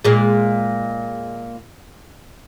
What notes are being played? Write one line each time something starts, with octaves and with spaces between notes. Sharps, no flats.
A#2 G#3